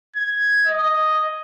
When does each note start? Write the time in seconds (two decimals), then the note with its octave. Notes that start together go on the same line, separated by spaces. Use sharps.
0.16 G#6
0.66 D#5